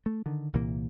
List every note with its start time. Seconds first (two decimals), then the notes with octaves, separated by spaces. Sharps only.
0.06 A3
0.26 D3 D#3
0.53 C2 A#2 E3 A#3